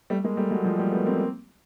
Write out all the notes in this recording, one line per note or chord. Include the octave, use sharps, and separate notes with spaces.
G3 A3
G#3 A#3
G3 A3
F#3 G#3
F3 G3
G3 A3
A3 B3
A#3 C4